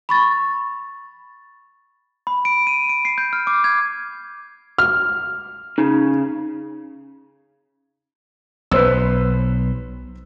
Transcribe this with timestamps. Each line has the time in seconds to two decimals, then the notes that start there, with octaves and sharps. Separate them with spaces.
0.09 B5 C#6 A6
2.27 B5
2.45 D7
2.67 D#7
2.89 D7
3.05 C7
3.18 G6
3.33 F6
3.47 D6
3.64 G#6
4.78 F6
5.78 C#3 D#4
8.71 B1 B4 C5 E6